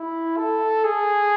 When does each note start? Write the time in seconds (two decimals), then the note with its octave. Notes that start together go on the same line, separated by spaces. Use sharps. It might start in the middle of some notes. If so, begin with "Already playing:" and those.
Already playing: E4
0.37 A4
0.85 G#4